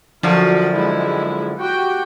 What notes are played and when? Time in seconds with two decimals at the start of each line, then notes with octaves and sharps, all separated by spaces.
0.23 F#2 D3 F3 F4 F#4
0.73 G#3 E4
1.58 F#4 G4 G5